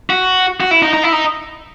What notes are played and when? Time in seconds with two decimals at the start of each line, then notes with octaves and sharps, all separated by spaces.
0.10 F#4
0.60 F#4
0.71 E4
0.82 D#4
0.93 D#4
1.03 E4
1.13 D#4